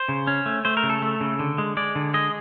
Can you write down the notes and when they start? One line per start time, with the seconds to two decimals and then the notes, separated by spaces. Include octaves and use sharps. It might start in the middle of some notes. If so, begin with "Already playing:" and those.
Already playing: C5
0.09 C#3
0.27 C#4
0.46 A3
0.65 A3 C5
0.77 A#4
0.83 C#3
0.90 A4
1.02 A3
1.21 C#3
1.39 D3
1.58 G#3
1.77 G#3 D5
1.95 D3
2.14 G#3 D#5